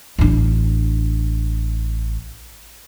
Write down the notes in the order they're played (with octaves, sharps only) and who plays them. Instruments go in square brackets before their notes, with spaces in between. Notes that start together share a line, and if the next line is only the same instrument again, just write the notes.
[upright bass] A1 D4